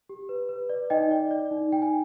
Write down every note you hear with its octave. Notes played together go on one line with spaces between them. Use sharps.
G4
B4
B4
D5
D#4 D#5 G5
D5
D5
D#4
D#4 G5
G#5